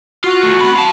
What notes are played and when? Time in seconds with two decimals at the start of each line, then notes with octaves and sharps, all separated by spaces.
0.24 F4 F#4
0.43 E2 A3
0.60 C4 B5
0.76 F5 A5